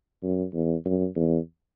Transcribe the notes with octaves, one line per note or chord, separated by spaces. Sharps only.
F#2
E2
F#2
E2